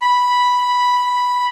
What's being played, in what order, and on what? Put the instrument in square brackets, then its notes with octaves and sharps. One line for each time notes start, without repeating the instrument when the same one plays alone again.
[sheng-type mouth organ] B5